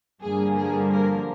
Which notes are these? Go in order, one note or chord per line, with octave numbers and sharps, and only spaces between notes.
G2 D3 F3 A#3 G#4
G#4
A#4